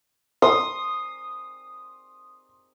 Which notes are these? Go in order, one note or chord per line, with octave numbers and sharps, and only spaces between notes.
C6 D#6